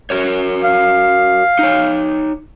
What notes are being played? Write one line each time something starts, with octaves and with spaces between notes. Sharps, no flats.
F#4 A#4 C#5
F5
D#4 C#5